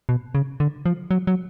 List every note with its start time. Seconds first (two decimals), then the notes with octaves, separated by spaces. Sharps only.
0.09 B2
0.35 C#3
0.60 D3
0.86 F3
1.11 F#3
1.27 F#3